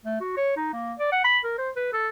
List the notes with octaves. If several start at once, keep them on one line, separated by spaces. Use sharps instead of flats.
A3
F#4
C#5
D#4
A#3
D5
F#5
B5
A#4
C5
B4
A4